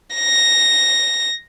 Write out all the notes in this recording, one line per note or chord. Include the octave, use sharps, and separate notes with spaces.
A#6